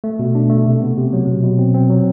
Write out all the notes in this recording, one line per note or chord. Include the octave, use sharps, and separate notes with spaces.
A3
B2
D4
A3
C3
B3
C3
F#3
B2
B2
C4
C4
F#3